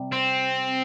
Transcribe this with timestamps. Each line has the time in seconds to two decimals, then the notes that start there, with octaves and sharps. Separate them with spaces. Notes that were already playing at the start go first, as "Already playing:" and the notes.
Already playing: C3 G3
0.12 C4